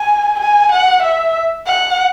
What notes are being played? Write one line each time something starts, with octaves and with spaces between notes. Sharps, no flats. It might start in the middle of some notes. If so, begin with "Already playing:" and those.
Already playing: G#5
G#5
F#5
E5
F#5